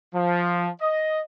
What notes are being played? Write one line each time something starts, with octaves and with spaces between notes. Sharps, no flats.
F3
D#5